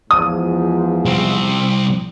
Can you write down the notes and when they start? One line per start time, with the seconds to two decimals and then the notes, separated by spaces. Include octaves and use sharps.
0.11 E2 G#2 F3 D#6
1.05 C2 C4